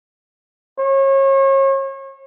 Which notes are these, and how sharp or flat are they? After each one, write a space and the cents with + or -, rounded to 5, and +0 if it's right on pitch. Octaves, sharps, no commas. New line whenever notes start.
C#5 -35